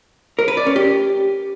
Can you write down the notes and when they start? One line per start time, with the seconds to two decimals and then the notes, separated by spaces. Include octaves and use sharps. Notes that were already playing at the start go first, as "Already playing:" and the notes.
0.39 A#4
0.48 B4
0.57 D5
0.66 C#4
0.76 G4